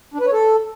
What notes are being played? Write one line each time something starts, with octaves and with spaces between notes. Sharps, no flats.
D4
B4
C#5
A4